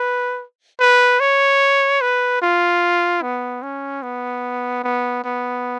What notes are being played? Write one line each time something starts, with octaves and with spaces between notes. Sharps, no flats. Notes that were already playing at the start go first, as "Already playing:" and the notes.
Already playing: B4
B4
C#5
B4
F4
B3
C#4
B3
B3
B3